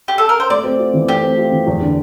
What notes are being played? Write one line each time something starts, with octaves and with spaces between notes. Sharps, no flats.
G4
A4
A#4
C5
A3 D5
C4
F4
E3
A3 G4
C4
F4
E3
E2
D3